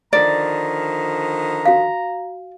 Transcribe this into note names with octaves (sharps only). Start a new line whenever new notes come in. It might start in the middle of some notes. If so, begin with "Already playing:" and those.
D3 D#3 F3 D5 A#5
F#4 F5